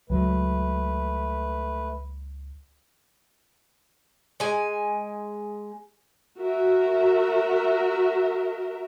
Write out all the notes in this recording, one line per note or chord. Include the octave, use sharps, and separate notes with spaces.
C#2 F#3 A3 B4
G#3 G#5
F#4 A#4 E5